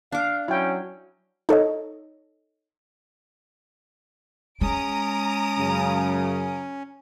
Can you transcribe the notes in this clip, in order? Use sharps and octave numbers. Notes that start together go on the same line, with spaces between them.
D4 F5 D6
F#3 C#4 E4 G5
D#4 A4 C#5 D#5
G#3 C#4 A#5 D#6 D7
F#2 C#3